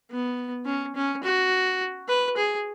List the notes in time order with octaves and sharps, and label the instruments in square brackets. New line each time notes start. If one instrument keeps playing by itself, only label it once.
[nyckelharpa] B3
C#4
C#4
F#4
B4
G#4